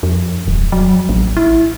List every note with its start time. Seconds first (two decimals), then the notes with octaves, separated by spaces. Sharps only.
0.03 F2
0.47 D1
0.72 F#3
1.09 A1
1.37 E4